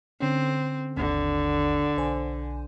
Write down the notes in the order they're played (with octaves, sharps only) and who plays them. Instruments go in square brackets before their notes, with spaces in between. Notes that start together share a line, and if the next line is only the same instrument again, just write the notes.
[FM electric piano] D3 C#4 [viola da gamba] C4
[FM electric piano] G#1 D#2 [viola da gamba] D3
[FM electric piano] B1 C5 G#5